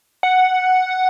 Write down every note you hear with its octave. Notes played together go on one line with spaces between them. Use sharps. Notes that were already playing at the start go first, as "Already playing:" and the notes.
F#5